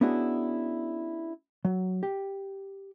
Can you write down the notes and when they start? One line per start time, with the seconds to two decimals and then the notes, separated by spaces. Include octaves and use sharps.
0.01 B3 C#4 D4 E4 F#4 G#4
1.65 F#3
2.03 G4